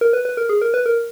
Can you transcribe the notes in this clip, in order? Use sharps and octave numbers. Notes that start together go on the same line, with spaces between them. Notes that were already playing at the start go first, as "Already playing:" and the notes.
A#4
B4
B4
A#4
G#4
A#4
B4
A#4